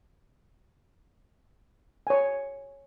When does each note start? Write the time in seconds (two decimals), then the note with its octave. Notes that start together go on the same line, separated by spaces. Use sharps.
2.07 C#5 G#5